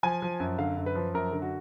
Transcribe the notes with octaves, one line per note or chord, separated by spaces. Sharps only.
F3 G#5
F3
F#2
D3 F5
F#2
B4
F3
F#2 A#4
D3
F#4